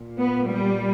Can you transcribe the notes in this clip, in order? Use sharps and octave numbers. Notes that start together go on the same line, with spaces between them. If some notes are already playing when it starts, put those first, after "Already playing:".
Already playing: A#2
B3
G3